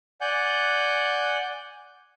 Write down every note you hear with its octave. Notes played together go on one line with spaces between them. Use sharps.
D5 F#5 G#5 F#6 G6